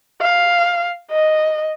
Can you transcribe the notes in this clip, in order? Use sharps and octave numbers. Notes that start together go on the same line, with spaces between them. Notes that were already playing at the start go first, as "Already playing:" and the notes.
F5
D#5